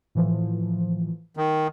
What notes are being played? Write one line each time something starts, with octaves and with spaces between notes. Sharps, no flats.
A2 E3 F3
D#3